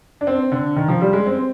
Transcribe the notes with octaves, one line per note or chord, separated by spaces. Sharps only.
D4
C4
D3
D#3
F3
G3
G#3
C4